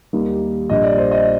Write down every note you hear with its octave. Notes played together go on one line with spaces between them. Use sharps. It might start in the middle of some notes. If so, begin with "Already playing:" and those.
D#2 D#3 G3 A#3
A#1 A#2 G3 D#5
D5
C5
D#5